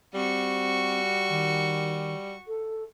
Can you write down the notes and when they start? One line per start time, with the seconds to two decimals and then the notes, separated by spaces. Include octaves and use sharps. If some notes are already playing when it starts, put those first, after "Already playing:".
0.14 G3 C4 F#4 C#6
1.29 D#3
2.48 A4